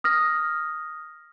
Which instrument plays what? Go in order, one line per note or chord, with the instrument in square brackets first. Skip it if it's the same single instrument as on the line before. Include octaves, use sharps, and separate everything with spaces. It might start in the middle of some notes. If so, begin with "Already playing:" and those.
[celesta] D#6 F6 A#6